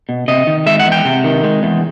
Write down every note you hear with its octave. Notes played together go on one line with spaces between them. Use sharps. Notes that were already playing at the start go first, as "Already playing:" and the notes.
B2
C3 D#5
D#3
G#3 E5
F#5
E2
G5
C3
D#3
G#3
E2